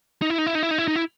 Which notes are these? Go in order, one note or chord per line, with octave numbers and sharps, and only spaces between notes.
D#4
E4
D#4
E4
D#4
E4
D#4
E4
D#4
E4